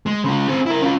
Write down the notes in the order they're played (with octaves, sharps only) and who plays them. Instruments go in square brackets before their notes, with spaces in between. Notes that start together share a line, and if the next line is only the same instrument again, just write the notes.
[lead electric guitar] G#3
C#3 G#3
C4 G#4
E4 A#4
C#4 F4